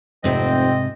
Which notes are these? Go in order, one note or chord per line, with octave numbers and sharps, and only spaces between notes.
F1 G#2 C3 C4 D#5